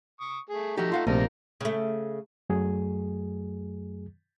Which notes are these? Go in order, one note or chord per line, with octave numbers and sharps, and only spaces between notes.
C#6 D#6
A3 G#4
F3 A3 D#4 F#4 G4 A4
F4 F5 F#5
A#1 C3 A3 D#4 F4 A#4
C#3 A3
F#2 F#3 A3 G#4